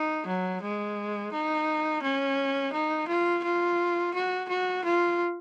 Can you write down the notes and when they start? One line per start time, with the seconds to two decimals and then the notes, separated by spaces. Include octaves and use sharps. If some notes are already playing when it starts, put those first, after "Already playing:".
Already playing: D#4
0.27 F#3
0.62 G#3
1.32 D#4
2.02 C#4
2.73 D#4
3.08 F4
3.44 F4
4.14 F#4
4.49 F#4
4.85 F4